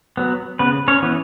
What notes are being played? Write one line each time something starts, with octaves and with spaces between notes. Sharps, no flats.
F#3 B3
C#3 B3 B4
C#4 C#5
E3 B3